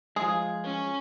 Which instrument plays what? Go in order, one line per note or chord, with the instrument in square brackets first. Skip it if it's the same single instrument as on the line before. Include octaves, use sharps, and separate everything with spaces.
[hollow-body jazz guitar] F3 G#3 [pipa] G#4
[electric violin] C#4